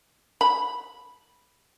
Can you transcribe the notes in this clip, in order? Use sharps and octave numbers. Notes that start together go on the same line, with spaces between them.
B5